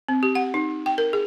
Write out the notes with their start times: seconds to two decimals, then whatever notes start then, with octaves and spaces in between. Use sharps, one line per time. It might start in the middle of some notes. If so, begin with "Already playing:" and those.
0.08 C4
0.23 G4
0.35 F#5
0.54 D#4
0.86 G5
0.98 A#4
1.13 G#4